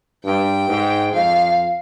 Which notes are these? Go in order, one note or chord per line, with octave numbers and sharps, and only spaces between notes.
G2 G5
G#2
F2 F5